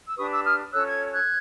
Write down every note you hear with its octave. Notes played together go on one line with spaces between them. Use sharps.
E6
D4 G4 B4 C#6 D#6
D6 E6
D#6 F6
C#4 F4 A4 C#5 E6 F#6
G#6
F#6 G#6